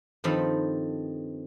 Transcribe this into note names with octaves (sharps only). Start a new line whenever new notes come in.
G2 D#3 F3 C4 A4 B5